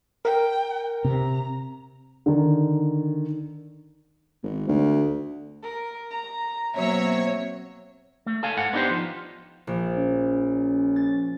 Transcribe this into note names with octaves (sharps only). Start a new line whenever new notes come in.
A#4 G5
C3 A#5
D3 D#3
G#1
D2
A#4
A#5
B2 F#3 A#3 C4 C#5 E5
A3
A4 F5 G#5
G#2 F#5
B3 D4 D#4 F4 G4 C5
F3
A#1
C#4
A6